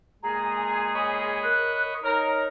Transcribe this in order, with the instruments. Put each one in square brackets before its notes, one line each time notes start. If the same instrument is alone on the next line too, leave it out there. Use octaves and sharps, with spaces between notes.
[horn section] A#2 G#3 G#4 [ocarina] A#5
[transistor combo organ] C#5 D#5 B5
[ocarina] A#4 [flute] F#6
[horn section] D#4 A#4 [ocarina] C#5 [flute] A#5